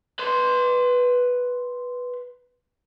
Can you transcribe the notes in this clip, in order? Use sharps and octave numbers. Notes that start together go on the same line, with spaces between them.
B4 C6